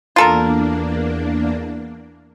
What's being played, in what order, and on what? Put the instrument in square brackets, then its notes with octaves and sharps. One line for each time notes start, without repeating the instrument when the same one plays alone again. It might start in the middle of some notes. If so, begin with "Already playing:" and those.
[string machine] E2 A#3 D4 [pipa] F4 A4 A#4